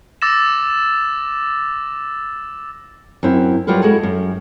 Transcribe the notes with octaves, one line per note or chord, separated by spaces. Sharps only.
D6 E6 A6 A#6 E7
F#2 C4 E4
F#3 G3 F4 A#4 B4
G#3 E4 F#4 G#4 A4
F#2